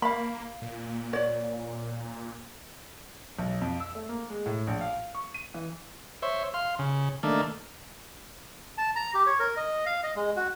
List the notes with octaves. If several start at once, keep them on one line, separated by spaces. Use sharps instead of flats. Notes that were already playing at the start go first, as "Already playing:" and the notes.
A#3 F5 B5
A#2
C#5 D5
B1
F2
E6
A3
A#3
G#3
A2
A#1
F5
C#6
D#7
E3
C5 C#5 E5
F5 C6
C#3
D#3 A3 A#3 D4
A5
A#5
G4
C#5
A#4
D#5
F5
D#5
G#3
F#4